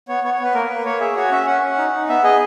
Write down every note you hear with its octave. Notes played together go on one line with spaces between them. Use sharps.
B3 C#5
B3 C#5
C#5
B3 B4
A#3 A#4
A#3 B4
A#3 C#5
G#4 E5
F#4 C#5
C#4 E5
C#4 F#5
C#4
D#4
D#4
B3 E5
G#4 D#5